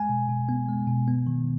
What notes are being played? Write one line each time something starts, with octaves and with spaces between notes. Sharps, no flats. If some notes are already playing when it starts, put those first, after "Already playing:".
Already playing: G#3 G#5
B2
B2
B3
G#3
B2
B3
D#3